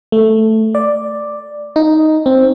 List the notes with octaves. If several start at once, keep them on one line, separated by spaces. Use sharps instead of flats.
A3
D5
D#4
C4